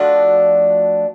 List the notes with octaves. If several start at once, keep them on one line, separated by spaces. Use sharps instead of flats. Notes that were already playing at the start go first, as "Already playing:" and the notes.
Already playing: F3 A3 D4 F#4